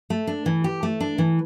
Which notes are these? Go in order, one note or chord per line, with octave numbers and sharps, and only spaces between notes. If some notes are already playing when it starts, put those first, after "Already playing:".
A3
D4
E3
G4
A3
D4
E3